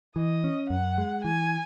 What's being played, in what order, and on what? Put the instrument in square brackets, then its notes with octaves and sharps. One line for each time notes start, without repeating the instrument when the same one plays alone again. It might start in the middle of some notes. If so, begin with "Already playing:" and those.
[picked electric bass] E3 [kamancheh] D#5
[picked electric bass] C#4
[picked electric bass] F#2 [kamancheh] F#5
[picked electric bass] G#3
[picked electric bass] E3 [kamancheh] G#5